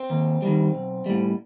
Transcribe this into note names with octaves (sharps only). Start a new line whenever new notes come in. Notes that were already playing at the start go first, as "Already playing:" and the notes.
Already playing: C4
D#2
D#3 G3
B1
A2 G3